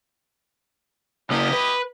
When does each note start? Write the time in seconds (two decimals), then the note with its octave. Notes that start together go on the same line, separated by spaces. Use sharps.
1.30 C#3 A#3 E4 G4 D#5
1.53 B4